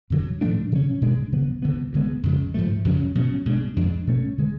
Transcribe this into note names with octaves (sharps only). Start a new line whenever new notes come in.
F2 D3 F#3
A2 F3 A3 D4
C#3 F#3 C#4
B2 G#3 D4
D2 C#3 F#3 B3
D2 D3 G#3 B3
D2 D3 G#3 B3
F2 C#3 G#3
G#2 F3 A3
F2 C#3 F#3 C#4
B2 F#3 C#4
B2 G#3 D4
F2 F3 G#3 D4
B2 A3 C#4
D3 G#3